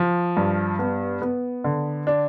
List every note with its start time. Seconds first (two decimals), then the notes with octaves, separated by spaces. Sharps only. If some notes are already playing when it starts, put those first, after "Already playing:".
Already playing: F3
0.37 G2
0.79 B3
1.22 B3
1.64 D3
2.07 D4